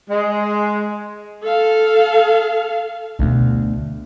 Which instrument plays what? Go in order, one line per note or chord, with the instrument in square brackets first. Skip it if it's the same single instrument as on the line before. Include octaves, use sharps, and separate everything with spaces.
[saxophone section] G#3
[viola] A4 F5
[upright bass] D2 B2